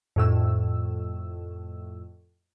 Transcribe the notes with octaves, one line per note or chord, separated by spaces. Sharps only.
F2 A2 E6